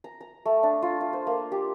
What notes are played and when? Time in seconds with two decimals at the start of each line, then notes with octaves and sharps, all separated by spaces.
0.04 A#5
0.21 A#5
0.45 A3
0.63 D4
0.82 F4
1.01 F5
1.13 C5
1.27 A#3
1.52 G4